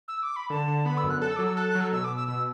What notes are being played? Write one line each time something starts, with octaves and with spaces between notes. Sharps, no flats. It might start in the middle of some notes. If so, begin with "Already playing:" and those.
E6
D6
B5
D3 A5
D3
B3 B5
E6
F#2
F#6
A4 F#6
E6
F#3 D6
E6
A4 F#6
F#6
F#3
E6
B2 E6
D6
B2
E6
B2 E6